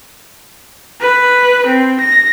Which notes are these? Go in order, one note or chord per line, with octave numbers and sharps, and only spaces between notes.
B4
C4
A#6